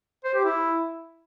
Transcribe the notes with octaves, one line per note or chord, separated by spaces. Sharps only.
C5
G4
E4